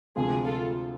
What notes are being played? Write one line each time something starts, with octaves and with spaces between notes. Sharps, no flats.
D2 C3 F3 G#3 G#4
F4 A4